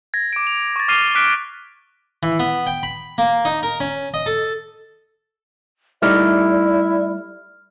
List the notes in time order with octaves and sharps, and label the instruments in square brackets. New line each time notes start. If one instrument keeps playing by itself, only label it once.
[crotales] G#6 A#6
D6 D7
F7
C#6 A6
D6 F6 C7 D#7 F7 G7
D6 F6 F#6 B6 D7
[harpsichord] E3
B3
G5
B5
A#3
D#4
A#4
C#4
D#5
A4
[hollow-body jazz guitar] G3 A3 D#4 [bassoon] E4 [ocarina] D5 [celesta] F6